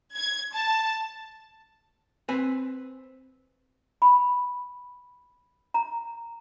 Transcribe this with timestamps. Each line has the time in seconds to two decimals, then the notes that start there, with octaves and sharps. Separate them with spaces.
0.16 G#6
0.54 A5
2.29 C4 B4 G#5
4.02 B5
5.74 A#5